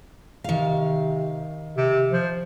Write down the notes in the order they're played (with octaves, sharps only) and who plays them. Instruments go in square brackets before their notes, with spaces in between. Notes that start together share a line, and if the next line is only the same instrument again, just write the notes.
[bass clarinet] C3 [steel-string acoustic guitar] D#3 F5
[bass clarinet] C3
F3